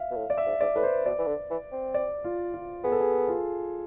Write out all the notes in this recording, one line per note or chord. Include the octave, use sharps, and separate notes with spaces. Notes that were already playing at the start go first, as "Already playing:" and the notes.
Already playing: E5 F5
B2
A2
D5
E5
G#2
G#2 D5
A2 B4
C5
B2 D5
E3
D3
E3
C4
D5
F4
F4
B3 G#4
A4
G#4
F4